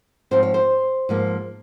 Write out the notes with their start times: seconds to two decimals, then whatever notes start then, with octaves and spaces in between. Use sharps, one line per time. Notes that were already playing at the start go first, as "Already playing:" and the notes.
0.31 G#2 F3 C4 C5
0.43 C#5
0.54 C5
1.09 G#2 F3 A#3